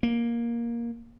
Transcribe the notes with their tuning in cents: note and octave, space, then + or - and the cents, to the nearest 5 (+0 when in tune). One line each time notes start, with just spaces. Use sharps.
A#3 +10